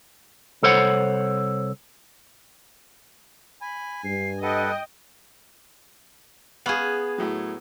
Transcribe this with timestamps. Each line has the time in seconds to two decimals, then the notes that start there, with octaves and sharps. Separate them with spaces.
0.63 C2 A4 C5 C#5 F#5
3.61 G#5 B5
4.05 G2 C7
4.43 A4 B4 D#5 F#5 G5
6.66 B3 G#4 F5 C#6
7.18 A2 F#3